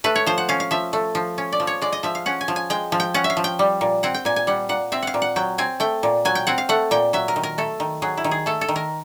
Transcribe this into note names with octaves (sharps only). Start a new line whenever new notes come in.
A3 B4
C#5
F3 C5
F#5
C#4 F5
F5
F3 E5
A3
F3
C#4
D5
F3
C#5
G#3 D5
D#5
F3 E5
F5
C#4 F#5
G#5
F3
G#5
G#3 G5
F3
G5
C#4 F#5
E5
F5
F3
G5
G3
A#2
C4 F#5
G5
A#2 G#5
G#5
G3 F#5
A#2 F#5
C4 E5
F5 F#5
A#2
F#5
F#3 G5
C4 G#5
A3 G5
A#2
F#3 G#5
G5
C4 F#5
F5
A3 F#5
A#2 G5
F#3 E5
A#4
D#3
A#4
A3 A4
D#3
F#3 G#4
E4
D#3
G#4
A3 A4
A4
D#3
A#4